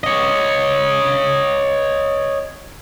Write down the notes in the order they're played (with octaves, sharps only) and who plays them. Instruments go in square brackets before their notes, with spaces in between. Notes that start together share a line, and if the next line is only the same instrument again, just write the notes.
[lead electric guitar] C#5 D#5